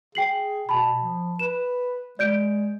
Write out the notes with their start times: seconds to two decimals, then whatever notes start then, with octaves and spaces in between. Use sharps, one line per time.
0.15 G#4 G5 C7 F#7
0.69 B2 A5 B5
1.00 F3
1.39 B4 E7
2.19 G#3 D5 G6 D7